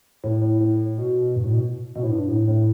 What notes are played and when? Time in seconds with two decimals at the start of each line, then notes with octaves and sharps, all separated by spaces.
0.24 A2
0.42 A2
0.61 A2
0.98 B2
1.36 G2
1.44 A2
1.54 B2
1.96 B2
2.03 A2
2.11 G2
2.28 A2
2.48 A2